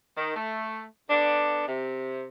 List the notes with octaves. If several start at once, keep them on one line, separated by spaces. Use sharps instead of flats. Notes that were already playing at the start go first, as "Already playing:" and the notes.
D#3
A3
D3 B3 D4
C3